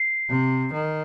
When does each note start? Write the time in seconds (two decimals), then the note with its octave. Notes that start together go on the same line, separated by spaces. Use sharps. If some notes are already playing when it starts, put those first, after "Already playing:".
Already playing: C7
0.30 C3
0.73 D#3